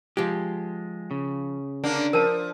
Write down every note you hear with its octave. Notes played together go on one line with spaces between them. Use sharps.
F3 G#3 G4
C#3
D3 A#3 D4
F3 A#4 A5